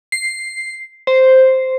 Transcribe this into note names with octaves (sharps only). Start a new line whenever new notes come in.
C7
C5